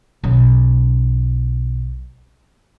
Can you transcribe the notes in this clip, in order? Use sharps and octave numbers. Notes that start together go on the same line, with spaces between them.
B1 C#4